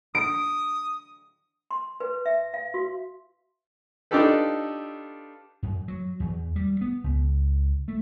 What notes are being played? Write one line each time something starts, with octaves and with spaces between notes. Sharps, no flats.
D#6 D7
C6
B4
E5
F5
F#4
D4 D#4 F4 G4 A4 B4
F#2
F#3
E2
G3
B3
C#2
A3